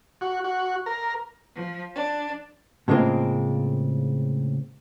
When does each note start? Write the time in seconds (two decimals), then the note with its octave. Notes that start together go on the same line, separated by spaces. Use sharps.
0.21 F#4
0.44 F#4
0.86 A#4
1.55 F3
1.95 D4
2.88 A2 C#3 G#3 A#3 C4 F4